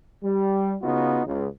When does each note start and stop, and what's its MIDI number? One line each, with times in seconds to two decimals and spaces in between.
0.24 0.76 55
0.82 1.21 49
0.82 1.21 59
0.82 1.21 63
0.82 1.21 65
0.82 1.21 66
1.26 1.47 37
1.26 1.47 49